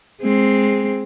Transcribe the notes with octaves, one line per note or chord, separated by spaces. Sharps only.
G#3 C4